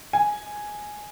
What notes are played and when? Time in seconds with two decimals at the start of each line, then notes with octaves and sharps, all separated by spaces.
0.13 G#5